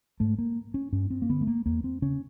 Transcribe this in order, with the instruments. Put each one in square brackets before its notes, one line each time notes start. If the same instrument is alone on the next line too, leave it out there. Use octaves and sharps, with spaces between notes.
[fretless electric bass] G#2 A3
A#3
C#4
G2 C#4
C4
A#3
D3 B3
A3
A#3
E2 A#3
C4
C#3 C#4